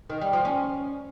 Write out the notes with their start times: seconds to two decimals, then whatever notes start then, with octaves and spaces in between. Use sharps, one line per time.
0.10 D#3
0.21 G3
0.33 F3
0.45 C#4